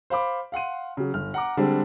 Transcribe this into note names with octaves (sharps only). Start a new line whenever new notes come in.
C5 F5 B5 D6
F5 F#5 C6 D#7
C#3 F#3
G1 F6
F#5 A#5 D6
D3 G3 G#3 C4 D4